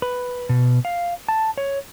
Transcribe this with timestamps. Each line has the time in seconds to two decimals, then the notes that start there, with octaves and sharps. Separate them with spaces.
0.02 B4
0.49 B2
0.85 F5
1.28 A5
1.58 C#5